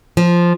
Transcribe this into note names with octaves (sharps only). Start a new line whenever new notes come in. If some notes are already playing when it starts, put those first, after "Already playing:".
F3